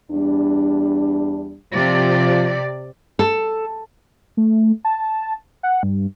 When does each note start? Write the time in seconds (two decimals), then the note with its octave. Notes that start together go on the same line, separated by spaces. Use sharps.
0.11 E2 G3 D4
1.73 C3 F3 D5
3.19 A4
4.37 A3
4.85 A5
5.63 F#5
5.83 G2